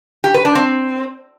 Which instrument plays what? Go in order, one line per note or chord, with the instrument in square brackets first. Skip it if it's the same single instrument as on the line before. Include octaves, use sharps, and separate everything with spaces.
[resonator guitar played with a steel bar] G4
B4
D4
C4